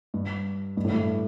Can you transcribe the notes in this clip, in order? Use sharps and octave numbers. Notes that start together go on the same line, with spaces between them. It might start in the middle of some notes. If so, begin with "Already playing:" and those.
G2
G2
A2
G2